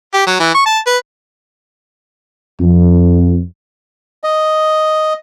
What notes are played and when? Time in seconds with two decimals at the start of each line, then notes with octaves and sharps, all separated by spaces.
0.14 G4
0.27 F#3
0.40 E3
0.54 C#6
0.66 A5
0.87 B4
2.60 F2
4.24 D#5